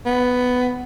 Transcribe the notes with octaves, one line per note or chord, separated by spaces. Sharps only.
B3